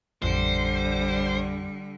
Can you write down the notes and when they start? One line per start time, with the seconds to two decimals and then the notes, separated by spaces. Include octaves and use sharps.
0.22 A1 F2 D3 G3 C5